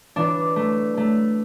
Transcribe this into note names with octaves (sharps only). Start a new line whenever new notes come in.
E3 D4
A3
A3